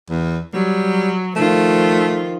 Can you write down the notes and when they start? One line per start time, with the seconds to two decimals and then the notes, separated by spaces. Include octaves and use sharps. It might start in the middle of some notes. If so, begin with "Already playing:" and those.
0.10 E2
0.54 F#3 G3
1.36 D#3 F3 A3 F4